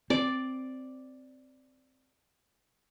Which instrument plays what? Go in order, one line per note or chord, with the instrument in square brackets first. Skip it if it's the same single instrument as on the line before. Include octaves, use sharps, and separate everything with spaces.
[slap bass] C4 [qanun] D5